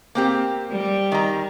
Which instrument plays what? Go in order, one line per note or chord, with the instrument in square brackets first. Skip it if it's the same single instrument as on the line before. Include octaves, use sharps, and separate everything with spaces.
[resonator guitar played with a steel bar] A#3 C4 G4
[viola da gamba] G3
[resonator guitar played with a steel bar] D#3 A#5